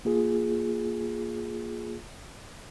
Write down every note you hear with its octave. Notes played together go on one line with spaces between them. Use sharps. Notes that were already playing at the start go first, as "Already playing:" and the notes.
A#3 F4 G#4